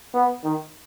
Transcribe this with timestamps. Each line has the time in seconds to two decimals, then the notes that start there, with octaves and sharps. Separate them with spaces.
0.14 B3
0.43 D#3